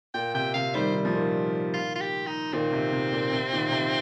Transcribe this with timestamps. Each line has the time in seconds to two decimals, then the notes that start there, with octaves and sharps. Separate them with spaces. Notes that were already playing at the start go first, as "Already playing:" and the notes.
0.14 A#2 G5
0.34 C3 G5
0.54 C3 F5
0.75 D#3 G3 C5
0.94 D#3
1.05 F3
1.14 A#2 D#3
1.74 F4
1.95 F4
2.00 G4
2.27 D#4
2.53 A#2 D#3 C4
2.73 C3
2.92 C3
3.13 A#2
3.33 C3
3.53 A#2 D#3
3.72 C3